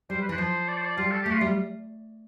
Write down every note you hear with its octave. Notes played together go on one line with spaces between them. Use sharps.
G3 C5
B4
E3
F3 C5
D5
C5
D5
G3 F4
A4
A3 G4
F4
G3